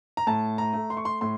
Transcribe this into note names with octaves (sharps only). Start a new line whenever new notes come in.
A#5
A2 A5
A#5
A3
C6
C#6
C6
A2 C6